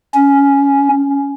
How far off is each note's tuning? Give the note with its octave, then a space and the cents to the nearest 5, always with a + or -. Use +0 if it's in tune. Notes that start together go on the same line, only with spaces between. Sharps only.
C#4 +10